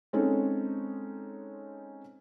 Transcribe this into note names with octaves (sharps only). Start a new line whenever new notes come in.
G#3 C4 C#4 D#4 A4 C#5